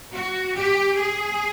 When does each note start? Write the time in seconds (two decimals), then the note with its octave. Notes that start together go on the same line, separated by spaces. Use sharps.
0.14 F#4
0.56 G4
0.97 G#4